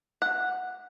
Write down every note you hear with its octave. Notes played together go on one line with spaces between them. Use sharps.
F#5